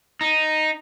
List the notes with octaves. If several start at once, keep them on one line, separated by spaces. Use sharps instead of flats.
D#4